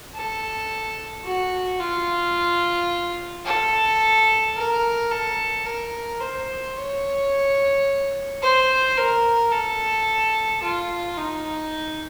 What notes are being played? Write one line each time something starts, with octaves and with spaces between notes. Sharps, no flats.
A4
F#4
F4
A4
A#4
A4
A#4
C5
C#5
C5
A#4
A4
F4
D#4